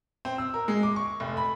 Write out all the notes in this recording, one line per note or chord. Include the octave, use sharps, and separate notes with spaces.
C4
E6
A#4
G#3
D6
C#6
F1
B5